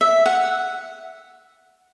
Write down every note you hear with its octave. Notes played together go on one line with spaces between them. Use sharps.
E5
F#5